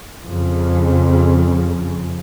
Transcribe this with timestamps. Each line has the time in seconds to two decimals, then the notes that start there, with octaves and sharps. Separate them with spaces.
0.23 F2 C#3